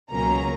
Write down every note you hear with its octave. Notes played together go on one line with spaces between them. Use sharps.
C#2 B2 F#3 A#3 C#4 A#5